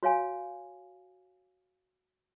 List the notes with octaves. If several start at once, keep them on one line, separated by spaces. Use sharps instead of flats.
F#4 C#5 F5 G#5